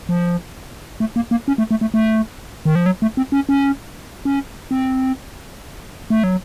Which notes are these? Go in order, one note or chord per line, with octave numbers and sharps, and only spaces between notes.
F3
A3
A#3
A#3
C#4
A3
A3
A3
A3
D#3
F3
F#3
A3
C4
C#4
C#4
C#4
C4
A3
F#3